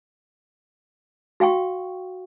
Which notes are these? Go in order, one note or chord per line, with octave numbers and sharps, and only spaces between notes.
F#4 F5 G5 C#6